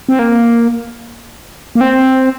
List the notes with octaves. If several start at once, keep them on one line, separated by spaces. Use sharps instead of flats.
C4
A#3
A#3
C4